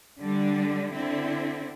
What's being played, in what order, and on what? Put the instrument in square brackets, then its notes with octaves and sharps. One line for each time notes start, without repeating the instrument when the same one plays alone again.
[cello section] D3 G3 D4
D3 C4 E4